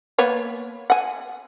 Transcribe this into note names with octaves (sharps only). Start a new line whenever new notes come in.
A#3 B3 C#5
F#5 G#5